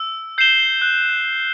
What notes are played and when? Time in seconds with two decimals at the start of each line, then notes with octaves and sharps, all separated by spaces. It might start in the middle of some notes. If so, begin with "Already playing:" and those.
Already playing: E6
0.38 G6 C7 E7 G7
0.82 F#6